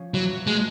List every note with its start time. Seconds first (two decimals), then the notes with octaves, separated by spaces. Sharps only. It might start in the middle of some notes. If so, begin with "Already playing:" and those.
Already playing: F3 C#4
0.14 E3 F#3
0.47 G#3 A3